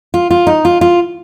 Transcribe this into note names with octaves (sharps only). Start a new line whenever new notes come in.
F4
F4
D#4
F4
F4